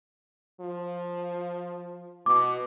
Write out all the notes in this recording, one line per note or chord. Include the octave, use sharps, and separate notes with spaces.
F3
B2 D6